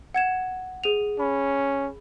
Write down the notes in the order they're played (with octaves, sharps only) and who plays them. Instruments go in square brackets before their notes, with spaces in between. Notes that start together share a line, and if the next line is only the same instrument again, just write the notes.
[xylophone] F#5 G#6 E7
G#4 D#7 F7
[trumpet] C#4 [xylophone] B5